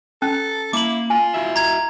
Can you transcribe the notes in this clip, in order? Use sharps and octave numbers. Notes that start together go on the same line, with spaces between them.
C#4 A4
A#3 E4 D6 F#7
F4 G#5
E4 F#4 E5
A#5 G#6